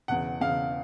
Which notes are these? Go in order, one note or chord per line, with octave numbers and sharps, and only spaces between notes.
E1 E2 C#3 F#5
E1 E2 C#3 F5